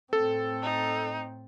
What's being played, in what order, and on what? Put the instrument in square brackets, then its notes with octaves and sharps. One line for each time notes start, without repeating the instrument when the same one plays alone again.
[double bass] A2 C4 [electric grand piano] A4
[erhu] D#4